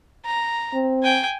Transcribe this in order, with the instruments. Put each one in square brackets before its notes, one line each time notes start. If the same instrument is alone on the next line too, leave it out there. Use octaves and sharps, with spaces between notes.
[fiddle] A#5
[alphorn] C4
[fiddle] G5 G#5